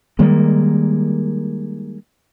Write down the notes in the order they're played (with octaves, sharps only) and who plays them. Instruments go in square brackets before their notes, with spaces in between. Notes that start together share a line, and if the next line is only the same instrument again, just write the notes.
[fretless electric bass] D#3 G3 G#3 A#3